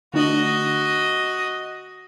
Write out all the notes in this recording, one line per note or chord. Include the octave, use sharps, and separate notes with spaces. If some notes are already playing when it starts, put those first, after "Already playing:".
D3 A3 D4 F#4 D#5